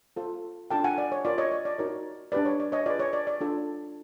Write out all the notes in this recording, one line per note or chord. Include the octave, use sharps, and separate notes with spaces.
F4 A4 C5
D4 F4 A4 G5 A5
F#5 G#5
D5
C#5
F4 A#4 C#5 D5
C#5 D#5
D5
D5
D#4 F#4 A#4 C#5
D4 G4 B4 D5
C#5
D5
C#5 D#5
F4 G#4 B4 D5
C#5
D5
D5
D4 F4 A4